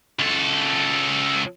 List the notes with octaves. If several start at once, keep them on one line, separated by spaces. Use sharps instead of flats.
C#2 A4